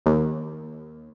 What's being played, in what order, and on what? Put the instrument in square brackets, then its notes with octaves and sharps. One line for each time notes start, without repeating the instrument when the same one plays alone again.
[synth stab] D#2